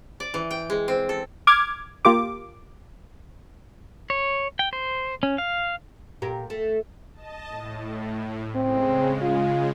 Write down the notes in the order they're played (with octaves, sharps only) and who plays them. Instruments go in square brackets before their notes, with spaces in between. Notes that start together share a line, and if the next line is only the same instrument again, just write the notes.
[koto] D5
E3
G5
G#3
C4
A4
[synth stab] D6 F6 G#6
A#3 F4 G4 D6
[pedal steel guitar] C#5
G5
C5
C#4
F5
[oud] A#2 G4 A#4
A3
[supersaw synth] D#5 A5
A2
[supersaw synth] C#3 G#3 [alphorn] C4
[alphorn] F4